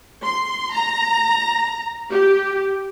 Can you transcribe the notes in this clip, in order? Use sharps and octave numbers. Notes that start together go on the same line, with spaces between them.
C6
A#5
G4